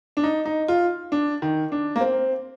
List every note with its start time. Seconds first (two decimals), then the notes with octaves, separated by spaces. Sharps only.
0.17 D4
0.24 D#4
0.45 D#4
0.68 F4
1.12 D4
1.42 D#3
1.72 D4
1.96 A#3
2.01 C4